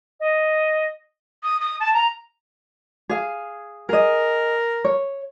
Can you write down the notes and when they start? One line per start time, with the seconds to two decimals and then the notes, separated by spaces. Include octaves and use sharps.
0.20 D#5
1.43 D#6
1.60 D#6
1.80 A5
1.93 A#5
3.09 G#4 F5
3.89 G#4 A#4 D#5
4.85 C#5